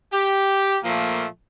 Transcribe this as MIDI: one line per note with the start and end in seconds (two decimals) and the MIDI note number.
0.13 0.77 67
0.84 1.25 46
0.84 1.25 53
0.84 1.25 57
0.84 1.25 58